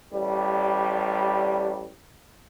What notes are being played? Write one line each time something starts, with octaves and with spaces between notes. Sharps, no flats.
A1 G3